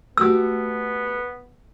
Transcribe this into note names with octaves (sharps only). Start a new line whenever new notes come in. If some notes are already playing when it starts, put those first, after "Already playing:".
A3 B3 F#4 G4 E6